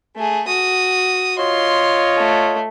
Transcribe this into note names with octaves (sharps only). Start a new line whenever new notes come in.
A3 G#4
F#4 D#6
F4 C#5 D#5 C6
A3